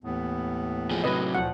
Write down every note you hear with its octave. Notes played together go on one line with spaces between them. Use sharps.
D#2 A2 E3 B3
F3 G#4
C3 F#3 B4 D#5
D2 A#2 F3 F#5